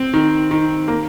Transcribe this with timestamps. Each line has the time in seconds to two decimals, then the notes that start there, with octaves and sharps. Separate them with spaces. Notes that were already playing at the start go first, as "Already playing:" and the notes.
Already playing: C4
0.13 D#3
0.51 D#3
0.88 A#3